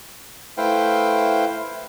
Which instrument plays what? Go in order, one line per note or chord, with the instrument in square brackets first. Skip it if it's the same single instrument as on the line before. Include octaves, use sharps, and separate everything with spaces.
[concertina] A3 E4 B4 C5 F5 G5